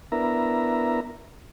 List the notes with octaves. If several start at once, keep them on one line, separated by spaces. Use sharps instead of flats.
B3 D4 E4 A#4 E5 A#5